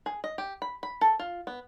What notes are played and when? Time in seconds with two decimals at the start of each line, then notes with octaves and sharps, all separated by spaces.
0.06 G#4
0.24 D#5
0.38 G4
0.62 B5
0.83 B5
1.01 A4
1.19 F4
1.47 B3